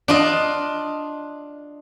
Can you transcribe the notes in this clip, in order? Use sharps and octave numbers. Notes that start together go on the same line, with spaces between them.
D4 F4 D#5